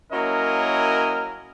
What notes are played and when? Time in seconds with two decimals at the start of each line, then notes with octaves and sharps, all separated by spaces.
0.12 F#3 A#3 C#4 E4 A#4 D#5